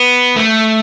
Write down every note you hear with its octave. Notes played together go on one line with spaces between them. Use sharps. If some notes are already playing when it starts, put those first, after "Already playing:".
Already playing: B3
A3